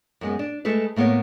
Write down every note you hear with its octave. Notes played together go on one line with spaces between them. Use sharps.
F#2 G#3 B3
D4
G#3 A3 A4 B4
A2 A#3 B3 A#4 C#5